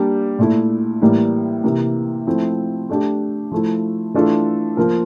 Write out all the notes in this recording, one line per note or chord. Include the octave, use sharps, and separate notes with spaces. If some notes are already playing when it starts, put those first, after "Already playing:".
Already playing: G3 A#3 D4 G4
A#2 A3 E4
A2 E3 G3 A#3
C3 E3 A#3
F3 A3 C4 E4
A3 D4 G4
F3 A3 E4
E3 A3 D4 F4 A4
F3 A#3 F4 A#4